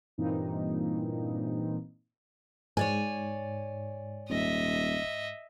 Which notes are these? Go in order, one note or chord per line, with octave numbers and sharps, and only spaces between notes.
G2 A#2 E3 A#3 C4 D#4
G#2 C#5 D5 G#5
D#1 D#5 E5